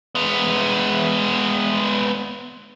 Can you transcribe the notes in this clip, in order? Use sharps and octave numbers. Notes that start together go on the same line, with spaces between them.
G#3 B3